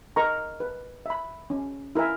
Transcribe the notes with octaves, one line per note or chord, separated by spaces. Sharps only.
A#4 D#5 A#5 C#6
B4
E5 B5
C#4
E4 A#4 E5 G#5